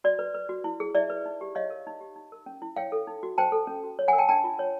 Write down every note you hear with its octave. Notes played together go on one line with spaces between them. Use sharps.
F#4 D5
B4
B4
F#4
E4
G#4
E4 D5 E5
B4
D#4
G4
C#5 D#5 F5
A#4
D#4
G4
D#4
A#4
C#4
E4
C#5 F5 G5
A4
D#4
F#4
C5 G5 A5
A4
C#4
F#4
C#5
F#5 G#5
A#4
G5 A5
D4 G5 A5
F4
C#5